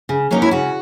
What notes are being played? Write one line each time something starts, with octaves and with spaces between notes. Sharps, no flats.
C#3
F#3 A#3 C#4 D#4
E4
C#3 F#4